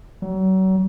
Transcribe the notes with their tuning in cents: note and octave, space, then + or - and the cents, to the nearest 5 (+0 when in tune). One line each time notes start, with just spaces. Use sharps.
F#3 +35